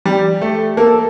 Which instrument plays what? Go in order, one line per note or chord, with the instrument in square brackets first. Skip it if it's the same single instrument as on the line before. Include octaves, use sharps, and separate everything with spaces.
[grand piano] G3 [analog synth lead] G4
[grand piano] A3
[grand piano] A#3 [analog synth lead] A4